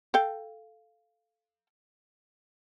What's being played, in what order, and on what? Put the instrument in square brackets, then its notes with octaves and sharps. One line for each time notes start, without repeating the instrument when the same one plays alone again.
[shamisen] A4 F5 G5